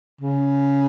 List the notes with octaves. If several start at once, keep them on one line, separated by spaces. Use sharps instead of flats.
C#3